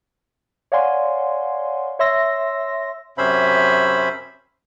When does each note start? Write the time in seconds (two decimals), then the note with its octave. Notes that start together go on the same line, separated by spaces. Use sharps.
0.72 C#5 D5 F5 F#5 G#5 C6
1.99 C#5 E5 C6 E6 A#6
3.18 F#2 C3 C#4 C5 E5 B5